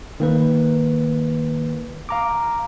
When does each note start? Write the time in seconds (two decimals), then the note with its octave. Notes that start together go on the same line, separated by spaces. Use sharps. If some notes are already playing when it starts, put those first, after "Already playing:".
0.20 D#3 A#3 B4
2.09 F5 A#5 D6